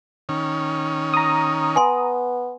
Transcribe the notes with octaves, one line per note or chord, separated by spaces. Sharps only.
D#3 C#4
A#5 D#6
B3 G#5 C6